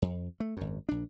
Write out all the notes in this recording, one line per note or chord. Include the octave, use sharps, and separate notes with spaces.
F2
A3
G#1 F#2
A#1 D4